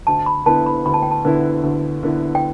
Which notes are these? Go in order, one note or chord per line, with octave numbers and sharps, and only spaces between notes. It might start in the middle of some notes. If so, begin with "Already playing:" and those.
D2 A5
B5
D3 B3 E4 B4 A5
B5
D2 B5
A5
G5
A5
D3 B3 E4 B4
D2
D3 B3 E4 B4
G5